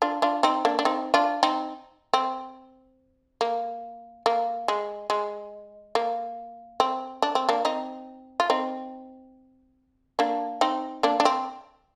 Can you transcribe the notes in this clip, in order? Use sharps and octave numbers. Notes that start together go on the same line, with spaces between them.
D4 F4
D4 F4
C4 D#4
A#3 D4
D4
C4 D#4
D4 F4
C4 D#4
C4
A#3
A#3
G#3
G#3
A#3
C4
D4
C4
A#3 D4
C4 D#4
F4
C4 D#4
A#3 D4
C4 D#4
A#3 D4
D4
C4